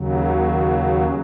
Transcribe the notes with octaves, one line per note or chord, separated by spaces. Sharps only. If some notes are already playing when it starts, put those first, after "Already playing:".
Already playing: D#2 C#3 F#3